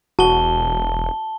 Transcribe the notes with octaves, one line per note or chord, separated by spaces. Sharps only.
E1 F#4 A5 G7